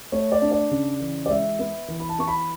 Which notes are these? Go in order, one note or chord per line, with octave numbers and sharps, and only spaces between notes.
A3 C#5
D5
D4
D5
C#3
E3
D5
G#3 E5
B3
E3
B5
A5
B3 C#6
B5